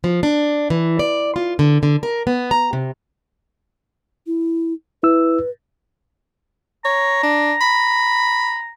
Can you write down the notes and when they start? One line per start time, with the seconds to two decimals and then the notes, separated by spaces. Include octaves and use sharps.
0.04 F3
0.23 D4
0.70 E3
0.99 D5
1.36 F4
1.59 D3
1.83 D3
2.03 A#4
2.27 B3
2.51 A#5
2.73 C3
4.27 E4
5.03 E4 B4 E6
6.85 C#5 A#5
7.23 D4
7.61 B5